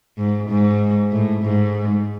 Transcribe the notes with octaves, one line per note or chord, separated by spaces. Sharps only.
G#2
G#2
A2
G#2